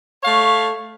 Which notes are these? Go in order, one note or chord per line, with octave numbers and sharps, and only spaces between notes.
A3 C#5 F5